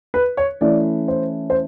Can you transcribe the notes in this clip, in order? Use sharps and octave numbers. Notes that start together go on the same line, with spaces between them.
B4
C#5
E3 A3 C#4 E4 D5
C5
C5